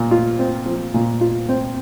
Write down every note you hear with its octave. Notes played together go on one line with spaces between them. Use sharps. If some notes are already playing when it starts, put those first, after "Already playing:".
Already playing: A#2
F4
C4
F3
A#2
F4
C4